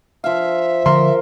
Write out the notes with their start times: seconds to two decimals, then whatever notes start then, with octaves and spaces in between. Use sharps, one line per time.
0.24 F3 E5 F5
0.86 D3 F3 A#4 C6